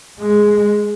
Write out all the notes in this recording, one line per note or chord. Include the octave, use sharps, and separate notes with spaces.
G#3